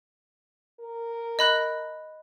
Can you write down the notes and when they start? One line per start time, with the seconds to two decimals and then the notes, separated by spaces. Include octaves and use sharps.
0.80 A#4
1.39 D#5 B5 F#6